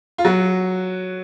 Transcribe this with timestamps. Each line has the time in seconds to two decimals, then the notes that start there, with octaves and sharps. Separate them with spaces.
0.18 F4
0.25 F#3 F#4